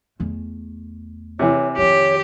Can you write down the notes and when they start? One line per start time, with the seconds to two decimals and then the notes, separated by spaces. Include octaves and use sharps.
0.20 E2 A3
1.39 C3 E3 C#5
1.77 F2 D#3 G4 C#5